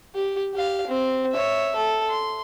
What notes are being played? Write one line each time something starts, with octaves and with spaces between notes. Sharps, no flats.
G4
G4 F5
C4
C#5 E5
A4
C6